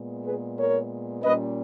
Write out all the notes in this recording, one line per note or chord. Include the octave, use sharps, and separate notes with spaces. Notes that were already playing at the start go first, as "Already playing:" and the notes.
Already playing: A#2 G#3 B3
G#4 B4
A#4 C#5
A#2 G3 A#3 C#4 B4 D#5